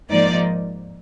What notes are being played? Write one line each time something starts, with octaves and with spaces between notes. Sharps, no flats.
G#2 F3 A#3 D#4 D5